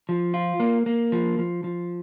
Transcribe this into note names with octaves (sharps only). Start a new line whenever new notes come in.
F3
F4
A#3
A#3
F3
F3
F3